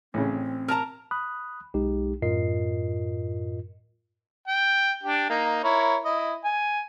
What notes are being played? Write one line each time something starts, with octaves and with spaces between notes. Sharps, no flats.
A1 C#3 C4
A#4 A5 A#5
B5 D#6 F#6
B1 G#3 D#4 G4
F#2 A2 F4 A#4 D#5 C7
G5
D4 G4
A#3 D#4
E4 A#4 C#5
E4 D#5
G#5